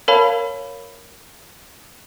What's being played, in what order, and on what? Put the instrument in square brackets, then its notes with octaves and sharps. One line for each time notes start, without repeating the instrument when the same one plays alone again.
[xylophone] A#4 C#5 F5 A5 B5